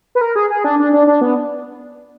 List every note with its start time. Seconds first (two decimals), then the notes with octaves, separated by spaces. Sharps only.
0.15 B4
0.21 A#4
0.36 G#4
0.50 G#4
0.64 D4
0.79 D4
0.93 D4
1.07 D4
1.21 B3